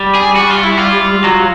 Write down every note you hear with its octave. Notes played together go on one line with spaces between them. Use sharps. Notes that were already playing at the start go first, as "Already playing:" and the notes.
Already playing: G3
G#4
F#4
F4
E4
F4
F#3